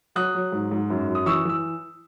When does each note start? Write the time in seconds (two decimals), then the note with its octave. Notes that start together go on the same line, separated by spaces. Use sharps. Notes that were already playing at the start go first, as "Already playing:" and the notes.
0.15 F#3 D#6 F#6
0.34 F#3
0.52 G#2
0.71 G#2
0.90 F#2
1.08 F#2
1.15 D#6
1.26 E3 C#6 E6
1.45 E3 E6